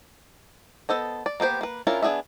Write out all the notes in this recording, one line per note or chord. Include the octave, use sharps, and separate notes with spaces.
B3 A4 C5 D#5
D5
A#3 B3 G4 C5
A#3 B4
C#4 D4 E4 F4 A#4
B3 D4 G#4 D#5 E5